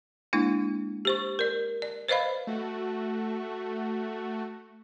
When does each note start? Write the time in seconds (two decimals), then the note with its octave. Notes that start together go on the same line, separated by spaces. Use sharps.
0.33 G#3 A#3 D4 E4
1.05 G4 C5 C#6
1.39 A#4 D5
1.82 D5
2.09 B4 C5 D5 D#5 F5 B5
2.47 A3 F#4